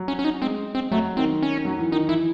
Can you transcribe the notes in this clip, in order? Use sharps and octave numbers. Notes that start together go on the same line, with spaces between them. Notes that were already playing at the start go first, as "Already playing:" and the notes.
Already playing: F#3
C#4
C#4
D#4
G#3 C4
C4
F#3 A3
D#3 C4
C#4
F#3
E3
D#3 D#4
E3 E4